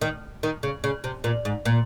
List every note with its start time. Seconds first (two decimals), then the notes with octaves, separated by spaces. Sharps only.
0.02 D#3
0.43 D#3
0.63 C#3
0.84 C#3
1.04 C3
1.24 A#2
1.45 G#2
1.65 A#2